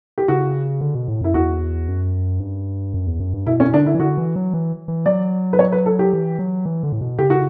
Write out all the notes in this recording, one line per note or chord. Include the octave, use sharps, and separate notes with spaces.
G4
C#3 F#4
D3
B2
A2
F#2 E4
E2 F#4
F#2
G2
F#2
E2
F#2
G2
B2 E4
C#4
D3 D4
E4
E3
D3 F#4
E3
F#3
E3
E3
F#3 D5
B4
C#5
B4
A4
G4
E3
F#3
E3
D3
A2
B2
C#3 G4
F#4